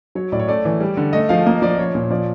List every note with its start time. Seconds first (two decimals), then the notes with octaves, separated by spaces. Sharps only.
0.15 F#3 C#5
0.32 A2 D5
0.40 C#5
0.48 A3 D5
0.65 E3
0.80 G3
0.97 D3
1.13 A3 D#5
1.29 F3 F5
1.46 A#3 D#5
1.62 F3 D5
1.78 F3 C#5
1.95 A#2
2.10 F3 D5